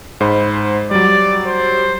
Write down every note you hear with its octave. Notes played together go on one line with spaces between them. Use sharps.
G#2 C5 B5
F#3 G3 D5
C5